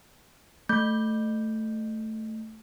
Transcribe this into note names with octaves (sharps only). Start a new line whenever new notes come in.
A3 G6